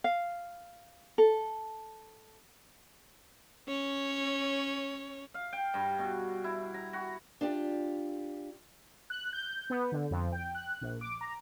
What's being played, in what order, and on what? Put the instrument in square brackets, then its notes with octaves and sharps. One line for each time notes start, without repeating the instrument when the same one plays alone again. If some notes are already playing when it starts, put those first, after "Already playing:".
[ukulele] F5
A4
[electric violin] C#4 C#5
[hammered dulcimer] F5
G5
G2
B2
E4
A#5
F#4
[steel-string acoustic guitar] D4 F4 G4
[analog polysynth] F#6
G6
B3
D3
F2
G5
F#6
A#1
D6
A#5